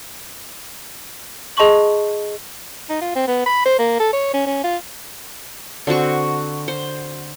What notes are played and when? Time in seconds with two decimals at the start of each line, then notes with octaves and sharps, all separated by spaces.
1.57 G#4 D#5 A5 C6 C#6 F#7
2.90 D#4
3.01 F4
3.16 C4
3.27 B3
3.46 B5
3.65 C5
3.79 A#3
4.00 A4
4.13 C#5
4.34 C#4
4.47 C#4
4.64 F4
5.87 D3 C4 F#4 C#6
6.68 C5